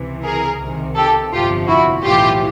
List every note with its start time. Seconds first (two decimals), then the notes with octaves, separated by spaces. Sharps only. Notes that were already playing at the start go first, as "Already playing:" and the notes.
Already playing: C#2 C3 E3
0.24 G#4 A#4
0.60 C2 C3 D#3
0.95 G4 A4
1.32 G1 F2 C3 F3 F4 G4
1.68 E4 F#4
2.04 B1 A2 E3 F4 G4